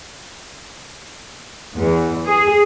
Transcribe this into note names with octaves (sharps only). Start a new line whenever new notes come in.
E2
G#4